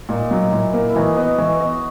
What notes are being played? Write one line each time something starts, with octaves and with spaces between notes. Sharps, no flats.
A#2 D#4
F#3
A#2 E4
A#3
E4
E3 D#4 F#4
B3 B4 D#5
E3 C#5 E5
B3 D#5 F#5